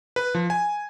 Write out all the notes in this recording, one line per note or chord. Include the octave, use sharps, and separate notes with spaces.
B4
F3
G#5